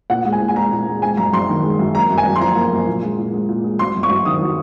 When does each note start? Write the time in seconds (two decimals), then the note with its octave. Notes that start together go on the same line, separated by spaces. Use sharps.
0.10 A#2 F#5
0.25 G#3
0.32 G#5
0.40 A#2
0.48 G#5
0.56 G#3 A#5
0.72 A#2
0.87 G#3
1.02 G#3 G#5
1.17 F#2 A#5
1.32 F#2 C6
1.49 D#3
1.63 G#3
1.79 F#2
1.95 A#3 A#5
2.10 F#2
2.18 G#5
2.26 F#2
2.36 C6
2.41 F3 A#5
2.56 A#3
2.72 F#2
2.87 A#2
3.02 G#3
3.17 A#2
3.33 G#3
3.49 A#2
3.64 G#3
3.79 F#3 C6
3.95 F#2
4.03 C#6
4.10 F#2
4.25 D#3 D#6
4.41 F#3